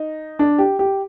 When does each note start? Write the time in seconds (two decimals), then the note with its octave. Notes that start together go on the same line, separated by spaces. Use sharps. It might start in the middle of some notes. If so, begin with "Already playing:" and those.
Already playing: D#4
0.39 D4
0.58 G4
0.79 G4